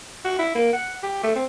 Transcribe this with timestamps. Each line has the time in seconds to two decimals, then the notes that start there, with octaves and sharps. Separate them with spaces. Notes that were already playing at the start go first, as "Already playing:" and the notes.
0.25 F#4
0.39 E4
0.55 A#3
0.73 F#5
1.03 G4
1.24 A3
1.35 C4